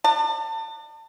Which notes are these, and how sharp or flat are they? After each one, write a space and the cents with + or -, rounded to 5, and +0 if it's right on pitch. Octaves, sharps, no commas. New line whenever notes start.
D5 +40 F#5 +0 A5 +30